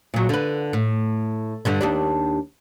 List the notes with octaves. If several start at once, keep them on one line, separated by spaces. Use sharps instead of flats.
A#2 F#3
D3 B4
A2
G2 D3 G3
D#2 G3 D4